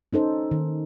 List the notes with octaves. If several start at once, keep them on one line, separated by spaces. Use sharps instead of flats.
C#4 D#4 A4 C5
D#3